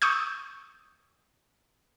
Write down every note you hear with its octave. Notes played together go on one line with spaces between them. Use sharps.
C#6 D#6 E6 G6